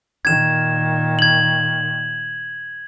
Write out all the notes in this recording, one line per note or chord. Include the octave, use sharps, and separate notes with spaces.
A#2 D#3 G#6 E7
G#6 F#7